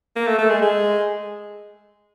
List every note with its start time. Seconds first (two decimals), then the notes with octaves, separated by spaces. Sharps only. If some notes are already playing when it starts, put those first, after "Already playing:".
0.16 A#3
0.27 A3
0.38 A3
0.50 G#3
0.62 G#3